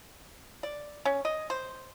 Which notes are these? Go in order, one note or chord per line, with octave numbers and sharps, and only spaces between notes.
D5
C#4
D#5
C5